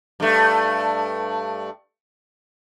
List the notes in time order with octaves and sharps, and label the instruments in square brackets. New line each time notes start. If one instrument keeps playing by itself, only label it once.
[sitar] G2 A3